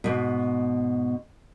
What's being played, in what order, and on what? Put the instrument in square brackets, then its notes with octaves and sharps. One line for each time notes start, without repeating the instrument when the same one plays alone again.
[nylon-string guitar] G#2 B2